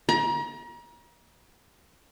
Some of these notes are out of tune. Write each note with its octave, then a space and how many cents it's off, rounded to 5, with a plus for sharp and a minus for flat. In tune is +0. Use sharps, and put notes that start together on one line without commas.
A#5 +35